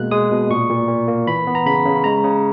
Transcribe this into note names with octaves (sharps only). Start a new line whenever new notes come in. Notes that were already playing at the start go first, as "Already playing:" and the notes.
Already playing: B2 G#3 A#3 F#6
G#3 D#6
B2
A#2 C#6
A#2
A#2
A#3
E3 B5
B3
A#5
C#3 B5
C#3
G#3 A#5
C#3